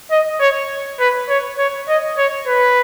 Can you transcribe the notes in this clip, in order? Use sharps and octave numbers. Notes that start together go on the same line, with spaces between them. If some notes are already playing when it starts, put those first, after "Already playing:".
D#5
C#5
B4
C#5
C#5
D#5
C#5
B4